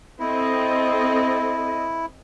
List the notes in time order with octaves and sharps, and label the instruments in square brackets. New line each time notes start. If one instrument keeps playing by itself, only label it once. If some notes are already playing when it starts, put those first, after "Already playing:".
[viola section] C4 A4 D#5 [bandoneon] E4